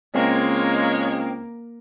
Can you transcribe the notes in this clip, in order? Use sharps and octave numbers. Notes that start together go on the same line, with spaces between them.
C#2 G#3 A#3 C4 C#5